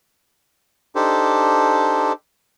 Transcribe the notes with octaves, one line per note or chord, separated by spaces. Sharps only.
D4 D#4 G4 A4 C5